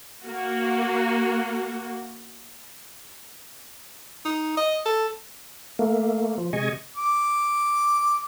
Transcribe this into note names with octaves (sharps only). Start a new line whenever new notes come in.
A#3 F#4
D#4
D#5
A4
A3 A#3
F3
C3 G#3 D#5 G#5 C#6
D6